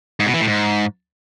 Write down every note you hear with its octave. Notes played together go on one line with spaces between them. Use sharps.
G#2
B2
E3
A2
G#2